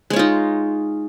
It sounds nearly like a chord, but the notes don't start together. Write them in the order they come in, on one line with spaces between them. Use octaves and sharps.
G#3 C#5 F4 D#4